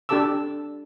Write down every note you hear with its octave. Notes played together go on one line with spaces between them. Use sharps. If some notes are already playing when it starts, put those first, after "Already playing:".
D4 G4 A4 A5 D6 E6